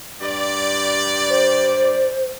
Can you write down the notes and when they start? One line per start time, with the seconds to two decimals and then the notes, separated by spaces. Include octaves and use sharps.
0.22 G2 G4 D5
1.30 C5